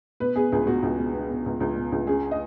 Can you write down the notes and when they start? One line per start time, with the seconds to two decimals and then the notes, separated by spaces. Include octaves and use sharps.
0.20 B2 B4
0.36 B3 G#4
0.52 C#2 G#4
0.67 B2 F#4
0.83 C#2
0.99 B2
1.14 B3
1.30 B2
1.46 C#2
1.60 C#2
1.77 B2
1.92 C#2
2.07 C#4 G#4
2.31 D#5